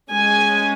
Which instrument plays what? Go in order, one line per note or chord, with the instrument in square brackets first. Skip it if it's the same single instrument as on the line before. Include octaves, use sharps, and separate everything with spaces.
[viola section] G#3 C#4 G#5